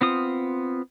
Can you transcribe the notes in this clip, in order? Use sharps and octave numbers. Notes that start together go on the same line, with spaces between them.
B3 C4 F4 D#6